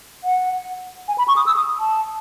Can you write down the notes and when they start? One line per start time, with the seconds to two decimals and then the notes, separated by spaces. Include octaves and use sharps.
0.24 F#5
1.08 G#5
1.18 B5
1.28 C#6
1.37 D#6
1.46 E6
1.57 D#6
1.80 A5